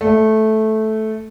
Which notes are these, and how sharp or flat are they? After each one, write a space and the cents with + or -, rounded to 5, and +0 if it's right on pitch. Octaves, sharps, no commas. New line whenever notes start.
A3 -10